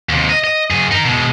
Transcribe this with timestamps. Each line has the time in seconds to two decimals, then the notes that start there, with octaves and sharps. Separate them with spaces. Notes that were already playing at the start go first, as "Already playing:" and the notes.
0.09 D#2 C3
0.29 D#5
0.44 D#5
0.71 F#2 G#4
0.91 D#4 A#4
1.05 B2 G#3